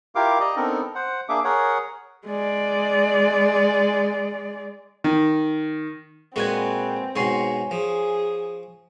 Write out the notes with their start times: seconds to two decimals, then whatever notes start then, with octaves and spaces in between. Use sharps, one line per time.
0.15 E4 F4 G4 A#4 F5 D6
0.40 D5 D#5 A#5
0.56 B3 C4 D4 D#4 A4 A#4
0.95 C5 F#5
1.29 A#3 D4 G#4 E5 D6
1.44 G#4 A#4 C#5 F#5
2.26 G#3 D5
5.04 D#3
6.36 A#2 G#3 C4 F#4 B4 G#5
7.16 G#2 B2 C#5 G#5 C6
7.71 F3 G#4